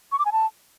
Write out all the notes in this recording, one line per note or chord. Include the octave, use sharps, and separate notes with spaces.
C#6
D6
G#5
A5